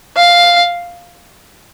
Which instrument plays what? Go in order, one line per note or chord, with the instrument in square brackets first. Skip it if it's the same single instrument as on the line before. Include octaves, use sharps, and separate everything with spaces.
[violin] F5